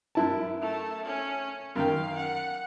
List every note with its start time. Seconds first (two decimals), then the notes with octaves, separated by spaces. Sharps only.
0.15 F#2 E4 A5
0.61 A3
1.06 C#4
1.76 F#2 D#3 F5 G5
2.16 F#5